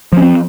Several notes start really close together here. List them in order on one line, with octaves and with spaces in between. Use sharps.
F3 C#4 C4